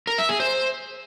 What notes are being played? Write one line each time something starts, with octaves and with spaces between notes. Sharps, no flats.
A#4
E5
G#4
C5